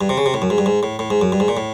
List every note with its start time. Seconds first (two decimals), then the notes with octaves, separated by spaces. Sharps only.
0.01 G2
0.09 C3
0.18 C#3
0.26 C3
0.34 A2
0.42 F#2
0.50 G#2
0.58 G2
0.66 G#2
0.83 A2
0.99 A2
1.10 G#2
1.21 F#2
1.32 G2
1.40 G#2
1.48 A#2
1.57 A2